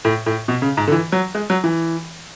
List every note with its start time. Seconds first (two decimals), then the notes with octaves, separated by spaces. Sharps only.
0.05 A2
0.26 A2
0.48 B2
0.62 C#3
0.77 G#2
0.88 D3
0.92 E3
1.12 F#3
1.35 G#3
1.50 F#3
1.64 E3